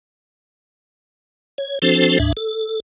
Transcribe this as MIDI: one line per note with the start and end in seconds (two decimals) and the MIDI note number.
1.58 1.79 73
1.82 2.18 53
1.82 2.18 60
1.82 2.18 62
1.82 2.18 66
1.82 2.18 69
1.82 2.18 72
2.19 2.32 38
2.19 2.32 44
2.19 2.32 62
2.19 2.32 76
2.37 2.80 69